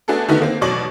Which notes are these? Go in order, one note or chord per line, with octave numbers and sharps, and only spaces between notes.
A3 B3 D4 F#4 G#4 A4
D3 D#3 A3 B3 D#4 F#4
A#3 C4
A1 B2 F#3 D5 C#6 F#7